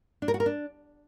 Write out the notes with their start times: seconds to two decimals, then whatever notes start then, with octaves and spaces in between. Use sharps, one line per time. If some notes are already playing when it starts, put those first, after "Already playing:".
0.22 D4
0.28 A#4
0.34 F#4
0.40 A#4
0.46 D4